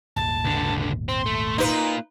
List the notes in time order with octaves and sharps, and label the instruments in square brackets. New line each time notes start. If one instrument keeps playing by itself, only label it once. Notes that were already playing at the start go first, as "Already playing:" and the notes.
[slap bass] D#1 G#1 D#2 [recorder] A5
[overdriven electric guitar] C#2 D3
[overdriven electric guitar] C4 [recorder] C6
[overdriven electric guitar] A3
[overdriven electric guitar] A#3 F4 [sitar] D#4 B4